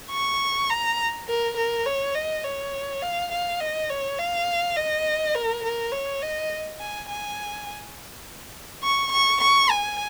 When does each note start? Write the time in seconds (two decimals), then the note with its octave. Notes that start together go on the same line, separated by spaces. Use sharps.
0.11 C#6
0.70 A#5
1.28 A#4
1.57 A#4
1.86 C#5
2.15 D#5
2.44 C#5
3.02 F5
3.32 F5
3.60 D#5
3.90 C#5
4.19 F5
4.77 D#5
5.35 A#4
5.64 A#4
5.92 C#5
6.22 D#5
6.80 G#5
7.09 G#5
8.83 C#6
9.12 C#6
9.41 C#6
9.71 G#5